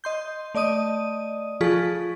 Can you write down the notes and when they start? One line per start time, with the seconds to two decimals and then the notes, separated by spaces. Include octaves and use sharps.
0.04 D#5 C6 G6
0.55 A3 D5 D#5 D#6 D#7
1.61 F3 F4 G#4 A4 C#6 B6